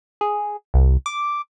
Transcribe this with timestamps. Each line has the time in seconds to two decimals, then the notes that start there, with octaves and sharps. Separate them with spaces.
0.21 G#4
0.74 C2
1.06 D6